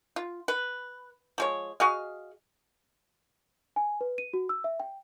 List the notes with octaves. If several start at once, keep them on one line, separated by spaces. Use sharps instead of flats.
F4
B4
F3 G#3 C#5
F#4 G#4 D#5 F5
G#5
B4
D#7
F#4
E6
E5
G5